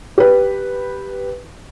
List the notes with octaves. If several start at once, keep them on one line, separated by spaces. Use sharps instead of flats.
G4 B4